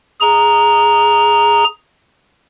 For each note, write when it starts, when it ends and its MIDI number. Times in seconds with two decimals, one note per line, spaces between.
0.21 1.64 68
0.21 1.64 82